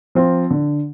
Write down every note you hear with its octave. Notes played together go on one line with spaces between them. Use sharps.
F3 C4 F4
D3